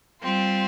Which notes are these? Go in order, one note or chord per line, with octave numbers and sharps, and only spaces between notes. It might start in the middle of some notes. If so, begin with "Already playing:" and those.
G3 C4 F4